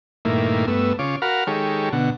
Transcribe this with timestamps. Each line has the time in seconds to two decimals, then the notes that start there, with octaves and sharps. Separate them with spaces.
0.25 G2 A#2 D#3 A3 A#3 E4
0.68 G2 A3 B3 E6
0.99 C#3 F4 C#5 D6
1.22 F#4 A#4 F5 F#5 B5 F6
1.47 D#3 G#3 G4 A4 C#5
1.92 B2 D3 F#5